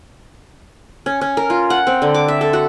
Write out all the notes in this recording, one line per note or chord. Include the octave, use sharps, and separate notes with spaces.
C#4
C#4
A#4
F4
F#5
C4
D3
D6
E5
A4
F#4